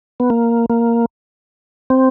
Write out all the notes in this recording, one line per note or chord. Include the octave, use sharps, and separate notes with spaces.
B3
A#3
A#3
C4